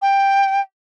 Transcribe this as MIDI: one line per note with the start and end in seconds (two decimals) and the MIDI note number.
0.01 0.60 79